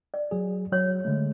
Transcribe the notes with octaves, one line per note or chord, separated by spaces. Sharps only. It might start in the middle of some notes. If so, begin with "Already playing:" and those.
D5
F#3 G#4
F#3 C#5
D3 G#3 A3